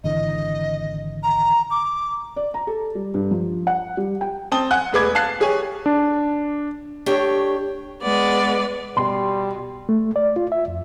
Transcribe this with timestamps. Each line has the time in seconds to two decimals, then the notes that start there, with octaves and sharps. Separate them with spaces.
0.04 G#1 D3 E3 D#5
1.23 A#5
1.71 D6
2.36 D5
2.54 A#5
2.67 A4
2.95 G3
3.14 G2
3.31 F3
3.67 F#5
3.97 G3
4.21 G5
4.52 C4 A5 D#6 G7
4.71 F#5 G#5 F#6
4.92 E1 A3 G#4 B4 D6 G#6
5.15 F5 A5 F#6 C7
5.40 G4 G#4 C#5 G#5
5.86 D4
7.06 A3 D4 G4 C#5
8.02 G#3 B3 D5
8.97 B2 G3 B3 C6
9.89 A3
10.16 D5
10.36 F4
10.52 E5
10.68 F2